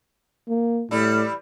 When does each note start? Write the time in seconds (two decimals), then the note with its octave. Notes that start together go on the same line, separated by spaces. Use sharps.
0.48 A#3
0.91 A2 E3 G3 E4